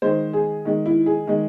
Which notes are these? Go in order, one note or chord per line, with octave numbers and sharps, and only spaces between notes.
D#3 G#3 C5
G#4
D#3 G#3
E4
G#4
D#3 G#3